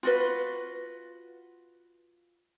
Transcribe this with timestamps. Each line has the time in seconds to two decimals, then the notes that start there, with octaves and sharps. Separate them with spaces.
0.03 F4 F#4 B4